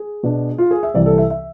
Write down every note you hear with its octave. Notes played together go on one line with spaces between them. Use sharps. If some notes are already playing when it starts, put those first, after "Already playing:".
Already playing: G#4
B2 B3 D4
F4
G#4
E5
C2 C3 E3 D5
A4
E5
E5